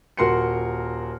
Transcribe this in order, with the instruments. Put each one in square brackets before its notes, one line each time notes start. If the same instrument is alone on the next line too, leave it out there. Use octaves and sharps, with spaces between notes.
[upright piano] D#1 F#4 A#4 C6 C7 C#7